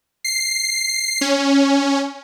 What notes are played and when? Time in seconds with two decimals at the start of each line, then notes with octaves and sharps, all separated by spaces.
0.24 C7
1.21 C#4